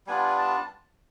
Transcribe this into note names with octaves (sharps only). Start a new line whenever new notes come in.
G3 B3 D4 F4 G#5
A5